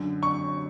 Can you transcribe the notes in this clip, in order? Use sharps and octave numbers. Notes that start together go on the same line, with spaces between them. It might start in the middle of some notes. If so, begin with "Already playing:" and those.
Already playing: F#2 D3
C#6